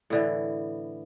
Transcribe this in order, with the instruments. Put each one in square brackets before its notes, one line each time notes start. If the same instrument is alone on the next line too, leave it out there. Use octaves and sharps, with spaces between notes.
[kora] A2 D3 E3